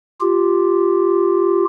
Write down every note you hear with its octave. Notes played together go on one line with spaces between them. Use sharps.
F4 G4